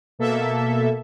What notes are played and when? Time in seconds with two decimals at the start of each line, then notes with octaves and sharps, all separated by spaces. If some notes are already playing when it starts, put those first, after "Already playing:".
0.19 B2 A#3 A4 E5